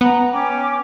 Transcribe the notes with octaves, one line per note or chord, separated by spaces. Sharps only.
B3 A#5
C#4 G5 D6